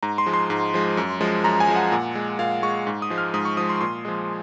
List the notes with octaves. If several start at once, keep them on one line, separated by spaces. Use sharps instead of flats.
G#2 A#5
C6
F3 G#3
C6
G#2
F3 G#3
F#2
F3 G#3
F#2 A#5
G#5
F3 G#3
F#5
A#2
G#3
A#2 F5
G#3 C#6
G#2
D#6
F3 G#3
F6
G#2 D#6
C#6
F3 G#3 D#6
C6
A#2 C6
F3 G#3